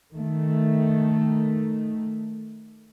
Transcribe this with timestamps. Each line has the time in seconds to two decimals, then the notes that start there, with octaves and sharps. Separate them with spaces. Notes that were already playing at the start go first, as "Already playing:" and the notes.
0.16 D#3 A3